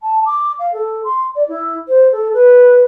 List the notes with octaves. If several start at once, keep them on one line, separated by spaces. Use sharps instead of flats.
A5
D6
F5
A4
C6
D5
E4
C5
A4
B4